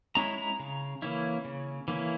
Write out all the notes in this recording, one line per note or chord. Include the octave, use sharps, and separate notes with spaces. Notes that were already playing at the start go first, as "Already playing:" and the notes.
G#3 C#4 E4 A#5
A#5
C#3
E3 A#3 C#4 E4
C#3
E3 A#3 C#4 E4